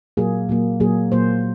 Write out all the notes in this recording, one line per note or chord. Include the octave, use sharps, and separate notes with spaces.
A#2 F#3 A#3 G#4
A#2 F#3 A#3
A#2 F#3 A#3 G#4
A#2 F#3 A#3 C5